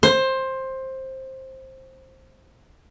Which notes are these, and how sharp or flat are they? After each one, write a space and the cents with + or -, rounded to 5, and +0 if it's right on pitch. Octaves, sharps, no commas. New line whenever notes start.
C5 +15